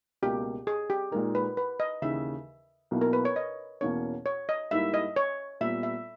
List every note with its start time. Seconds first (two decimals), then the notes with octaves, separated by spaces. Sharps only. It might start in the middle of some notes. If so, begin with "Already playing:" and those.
0.22 C#2 B2 A#3 G4
0.67 G#4
0.90 G4
1.11 A#2 G#3 D#4 A#4
1.35 B4
1.57 B4
1.80 D#5
2.02 D#2 C#3 E3 E5
2.91 B1 B2 A#3 E4
3.01 A#4
3.13 B4
3.25 C#5
3.36 D#5
3.81 E2 B2 A#3 C#4 C#5
4.26 C#5
4.49 D#5
4.71 G#2 G3 A#3 E4 E5
4.94 D#5
5.16 C#5
5.61 A#2 G3 B3 E5
5.83 E5